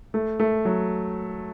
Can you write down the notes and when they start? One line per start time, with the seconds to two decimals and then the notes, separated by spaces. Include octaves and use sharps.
0.14 A3
0.40 A3
0.65 F#3